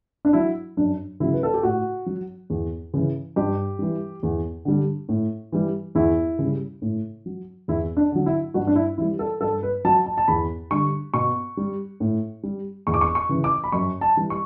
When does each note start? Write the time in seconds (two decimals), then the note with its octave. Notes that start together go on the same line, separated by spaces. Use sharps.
0.25 D4
0.33 F#3 E4
0.77 F#2 D4
1.20 C#3 F#3 E4
1.33 B4
1.43 A4
1.54 G4
1.63 A2 F#4
2.06 F#3
2.50 E2
2.94 C#3 E3
3.36 G2 G4
3.79 E3 G3
4.23 E2
4.65 D3 G3
5.09 A2
5.52 E3 G3
5.95 E2 E4
6.39 C#3 G3
6.82 A2
7.26 F#3
7.68 E2 E4
7.97 D4
8.12 D3 F#3
8.26 E4
8.54 G2 F#4
8.67 D4
8.76 E4
8.98 E3 G3 E4
9.19 A4
9.41 G2 A4
9.63 B4
9.85 F#3 A5
10.06 A5
10.18 A5
10.28 E2 B5
10.71 D3 G3 C#6
11.14 B2 C#6
11.57 G3
12.00 A2
12.43 G3
12.87 E2 C#6
12.94 D6
13.01 C#6
13.15 C#6
13.29 C#3 E3
13.44 D6
13.64 B5
13.72 F#2 C#6
14.01 A5
14.17 E3 G3
14.30 C#6